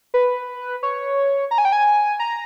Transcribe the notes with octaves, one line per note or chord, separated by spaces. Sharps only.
B4
C#5
A#5
G#5
G5
G#5
A#5